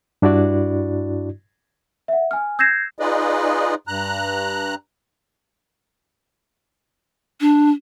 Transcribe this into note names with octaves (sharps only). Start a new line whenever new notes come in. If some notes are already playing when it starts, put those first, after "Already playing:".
G2 D4 E4 F#4 D5
E5 F#5
G#5 F6
E6 G6 G#6 A#6 C7 E7
D#4 F4 G#4 B4 D5 D#5
G2 A#5 F#6
D4